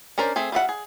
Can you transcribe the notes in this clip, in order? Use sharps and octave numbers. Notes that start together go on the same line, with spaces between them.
C#4 D4 A#4 C5 D5
A3 C4 G#4
G3 F4 E5 F#5
G#4